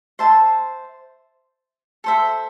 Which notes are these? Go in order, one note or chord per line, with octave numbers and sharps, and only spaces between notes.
C5 E5 A5 C6
A4 C5 E5